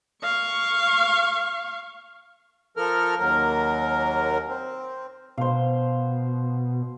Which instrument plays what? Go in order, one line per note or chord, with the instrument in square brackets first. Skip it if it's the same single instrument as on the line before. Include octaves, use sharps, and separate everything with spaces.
[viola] F5 C#6
[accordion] F3 A4 A#4 F6
D#2 F#3 A#4
C4
[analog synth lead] B2 [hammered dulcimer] C5 F5